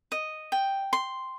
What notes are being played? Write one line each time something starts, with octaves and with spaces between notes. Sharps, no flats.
D#5
G5
C6